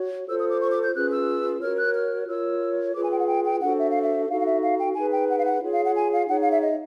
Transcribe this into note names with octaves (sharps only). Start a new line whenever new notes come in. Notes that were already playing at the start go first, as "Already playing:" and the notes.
Already playing: F#4 C#5
F4 A4 C5 E6
D#6
D6
C#6
D6
G6
C#4 F4 G#4 B4 F#6
E6
F#4 A#4 C#5 F6
F#6
F6
F4 A#4 C#5 E6
F4 G#4 B4 D6
G#5
G5
F#5
G5
G5
D4 F#4 A4 C5 F#5
E5
F5
E5
D#4 F#4 A4 F5
F5
E5
F5
G5
D#4 G#4 B4 G#5
G5
F#5
F5
F#5
F4 G#4 C#5
F5
F#5
G#5
F5
D#4 G#4 C#5 F#5
F5
E5
D#5